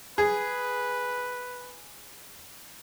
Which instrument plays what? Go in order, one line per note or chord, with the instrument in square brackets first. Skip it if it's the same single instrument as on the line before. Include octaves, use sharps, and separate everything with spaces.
[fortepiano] G#4 [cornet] B4